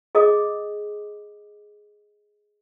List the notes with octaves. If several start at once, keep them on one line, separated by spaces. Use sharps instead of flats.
G#4 D#5 D6 D#6